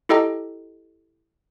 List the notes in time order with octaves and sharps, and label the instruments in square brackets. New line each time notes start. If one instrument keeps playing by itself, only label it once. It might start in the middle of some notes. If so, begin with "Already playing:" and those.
[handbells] E4 G4 A4 D#5 G5 A#5